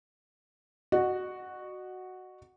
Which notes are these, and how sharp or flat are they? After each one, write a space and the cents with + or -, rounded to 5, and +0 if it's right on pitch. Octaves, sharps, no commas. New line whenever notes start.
F#4 +0 D#5 -40